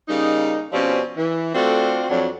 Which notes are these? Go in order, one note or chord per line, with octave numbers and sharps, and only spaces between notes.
C#3 G3 A#3 D#4
B2 F3 G3 C4 C#4
E3
A3 C4 D4 F4 F#4 A4
F2 F#3 D4